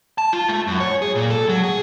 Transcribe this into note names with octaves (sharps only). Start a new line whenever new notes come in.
A5
F4
A3
F#2
C#5
G#4
A#2
A4
F#3
G#4